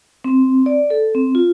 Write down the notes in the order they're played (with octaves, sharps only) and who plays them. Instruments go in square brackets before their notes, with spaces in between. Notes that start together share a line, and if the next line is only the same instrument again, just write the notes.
[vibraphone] C4
D5
A4
C4
F4